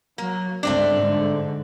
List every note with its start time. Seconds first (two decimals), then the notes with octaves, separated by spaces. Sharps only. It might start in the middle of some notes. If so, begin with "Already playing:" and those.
0.18 F#3 A#3
0.63 G1 C#2 G2 A3 C4 D4
0.95 G#2 D3